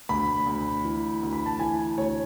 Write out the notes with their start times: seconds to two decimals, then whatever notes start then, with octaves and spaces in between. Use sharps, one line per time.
0.09 D2 B5
0.46 D2
0.85 E3
1.23 D2
1.33 B5
1.46 A5
1.59 E3 G#5
1.98 D2 C#5